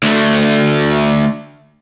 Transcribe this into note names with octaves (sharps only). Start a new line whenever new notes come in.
D2 A3